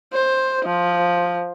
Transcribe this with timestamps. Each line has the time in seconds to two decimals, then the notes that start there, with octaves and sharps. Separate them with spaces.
0.13 C5
0.65 F3